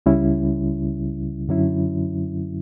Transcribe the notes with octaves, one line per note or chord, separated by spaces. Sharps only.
C#2 C#3 G3 C#4 E4
F#2 D3 F#3 C#4 E4